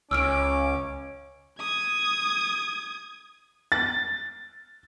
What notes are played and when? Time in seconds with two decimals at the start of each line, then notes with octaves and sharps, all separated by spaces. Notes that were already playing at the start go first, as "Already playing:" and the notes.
0.11 C#2 C#4 D6 E6 F6 D7
1.60 D#6 G#6
3.72 A6